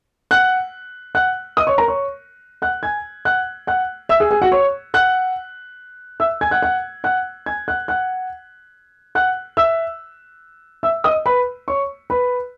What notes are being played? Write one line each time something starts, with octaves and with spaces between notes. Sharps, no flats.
F#5 F#6
F#5 F#6
D#5 D#6
C#5 C#6
A#4 A#5
C#5 C#6
F#5 F#6
G#5 G#6
F#5 F#6
F#5 F#6
E5 E6
G#4 G#5
G#4 G#5
F#4 F#5
C#5 C#6
F#5 F#6
E5 E6
G#5 G#6
F#5 F#6
F#5 F#6
F#5 F#6
G#5 G#6
F#5 F#6
F#5 F#6
F#5 F#6
E5 E6
E5 E6
D#5 D#6
B4 B5
C#5 C#6
B4 B5